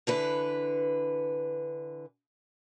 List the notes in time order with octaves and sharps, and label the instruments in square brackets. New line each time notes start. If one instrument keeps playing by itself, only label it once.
[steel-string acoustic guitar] D3 E3 B4